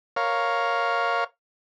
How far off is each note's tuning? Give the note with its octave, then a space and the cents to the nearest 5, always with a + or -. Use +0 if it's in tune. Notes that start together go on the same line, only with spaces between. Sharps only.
A#4 +0 C#5 +0 F5 +0